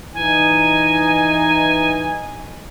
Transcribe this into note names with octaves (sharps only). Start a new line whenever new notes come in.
E3 D#4 G#5